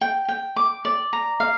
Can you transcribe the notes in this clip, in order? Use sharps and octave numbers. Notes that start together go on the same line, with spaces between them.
G5
G5
D6
D5
A#5
F5